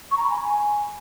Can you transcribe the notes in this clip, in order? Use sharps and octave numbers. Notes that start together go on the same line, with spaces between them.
C#6
A#5
B5
G#5